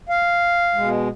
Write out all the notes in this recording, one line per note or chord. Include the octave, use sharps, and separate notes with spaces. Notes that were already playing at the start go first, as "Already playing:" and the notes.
F5
B2 G#3